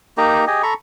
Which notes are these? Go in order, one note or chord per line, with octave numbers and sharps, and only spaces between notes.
A#3 D#4 G4 A#5
G4 G#4 D#5
A4 A#5 B5 C#6